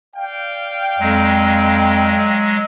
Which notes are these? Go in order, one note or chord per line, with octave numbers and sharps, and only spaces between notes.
D5 F5 G5
F2 F#3 G#3